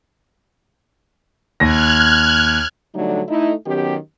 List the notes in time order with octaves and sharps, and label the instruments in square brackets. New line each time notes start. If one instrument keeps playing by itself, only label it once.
[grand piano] D#2 A#6 [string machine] F6 F#6 G#6
[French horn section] D3 F#3 G3 A3 D4 D#4
A3 D#4 E4
D#3 F#3 B3 C#4 G4